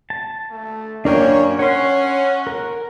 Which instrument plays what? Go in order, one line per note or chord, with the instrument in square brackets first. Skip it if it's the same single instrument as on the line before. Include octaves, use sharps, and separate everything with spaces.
[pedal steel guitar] A5
[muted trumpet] A3
[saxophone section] F#2 A#3 [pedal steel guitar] D4 A#4 G5 [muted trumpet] C#5
[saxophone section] C#4 [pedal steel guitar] C#5 C6 [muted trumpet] F#5
[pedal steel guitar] A#4